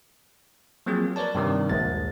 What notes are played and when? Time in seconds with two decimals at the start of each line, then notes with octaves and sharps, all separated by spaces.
0.86 F3 F#3 A#3 C4 G#4
1.16 A#4 B4 C#5 D5 A5
1.35 G2 C3 D#3 G3
1.70 A#1 D#2 G#3 A6